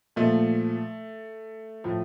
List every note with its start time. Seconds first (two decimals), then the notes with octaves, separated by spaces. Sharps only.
0.16 A#2 F3 A3
1.84 A2 F3